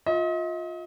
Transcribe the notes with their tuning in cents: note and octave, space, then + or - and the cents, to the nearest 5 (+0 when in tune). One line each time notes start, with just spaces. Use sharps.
F4 +20 D#5 +40